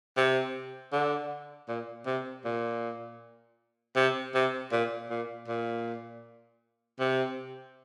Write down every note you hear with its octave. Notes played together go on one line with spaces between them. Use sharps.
C3
D3
A#2
C3
A#2
C3
C3
A#2
A#2
A#2
C3